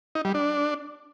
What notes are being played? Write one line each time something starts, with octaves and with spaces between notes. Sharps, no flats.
D#4
G3
D4